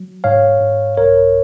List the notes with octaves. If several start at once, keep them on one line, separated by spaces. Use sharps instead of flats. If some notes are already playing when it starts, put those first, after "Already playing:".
Already playing: F#3
G#2 C#5 F5
G#2
C2 A#4 C#5